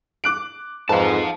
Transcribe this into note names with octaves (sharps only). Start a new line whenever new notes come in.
D6 F#6 D7
F2 G#2 B4 F5 A5